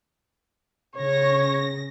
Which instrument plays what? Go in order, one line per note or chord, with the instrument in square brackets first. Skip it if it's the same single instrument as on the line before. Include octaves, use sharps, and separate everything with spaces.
[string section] C#3 A#6 [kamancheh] C#5